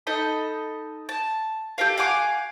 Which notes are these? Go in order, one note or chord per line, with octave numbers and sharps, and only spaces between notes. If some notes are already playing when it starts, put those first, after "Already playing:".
D#4 A4 D#5 B5
A5
G4 A4 A#4 F5
F5 F#5 G#5 D6